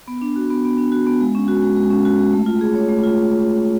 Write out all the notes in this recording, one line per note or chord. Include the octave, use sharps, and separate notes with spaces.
B3
D4
F#4
B3
B3
D4
F#4
B3
G#3
C#4
F#4
G#3
G#3
C#4
F#4
G#3
A3
F4
G#4
C#5
A3
F4